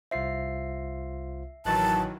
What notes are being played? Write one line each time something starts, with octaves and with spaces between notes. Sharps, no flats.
C2 F4 C5 E5 C7
A1 D#3 E3 F#3 A5 F#6 A6